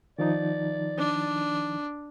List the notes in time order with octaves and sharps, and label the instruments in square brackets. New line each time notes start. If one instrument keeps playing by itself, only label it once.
[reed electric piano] D#3 F3 D#4 [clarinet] D5
[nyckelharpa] D4